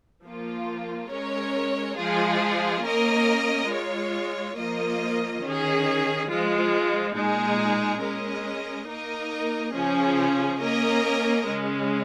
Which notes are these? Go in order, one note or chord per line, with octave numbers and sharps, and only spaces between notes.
F3 A#3 F4
G#3 C#4 A#4 C#5
F3 G#3 F4 G#4
A#3 C#4 A#4 D#5
G#3 F4 C#5
F3 A#3 F4 A#4 D#5
D#3 C#4 G#4
F3 G#3 F4
A#2 G#3 D#4 G#4
G#3 C#4 A#4 D#5
A#3 D#4 A#4 D#5
C#3 F3 C#4 G#4
A#3 C#4 A#4 D#5
C#3 G#3 C#4